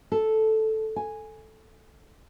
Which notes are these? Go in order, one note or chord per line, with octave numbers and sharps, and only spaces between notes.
A4
G#5